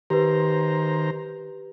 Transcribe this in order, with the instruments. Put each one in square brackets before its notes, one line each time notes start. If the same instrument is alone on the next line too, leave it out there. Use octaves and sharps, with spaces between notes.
[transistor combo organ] D#3 C5 A#5 [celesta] G4 B4